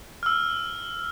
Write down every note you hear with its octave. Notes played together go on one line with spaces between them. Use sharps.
E6 F6